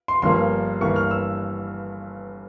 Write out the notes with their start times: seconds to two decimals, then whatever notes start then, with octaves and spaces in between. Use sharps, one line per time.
0.08 C6
0.22 G1 G2 F3 A#3 C6
0.81 G1 G2 E3 A#3 C#6
0.96 F6
1.11 E6